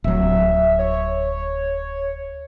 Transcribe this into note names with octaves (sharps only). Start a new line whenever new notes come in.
D1 F#3 E5
C#5